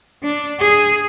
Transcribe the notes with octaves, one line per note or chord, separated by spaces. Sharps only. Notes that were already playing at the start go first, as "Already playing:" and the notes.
D4
G#4